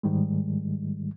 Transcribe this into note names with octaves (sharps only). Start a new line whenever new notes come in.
G#2 D#3 G3 G#3